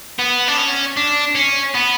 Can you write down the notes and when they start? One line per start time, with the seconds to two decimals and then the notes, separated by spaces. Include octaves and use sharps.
0.19 B3
0.48 D4
0.57 C#4
0.97 D4
1.35 C#4
1.74 B3